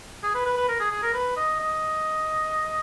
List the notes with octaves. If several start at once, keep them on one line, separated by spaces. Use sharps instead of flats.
G#4
B4
B4
B4
A#4
G#4
G#4
A#4
B4
D#5
D#5